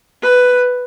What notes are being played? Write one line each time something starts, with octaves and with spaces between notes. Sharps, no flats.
B4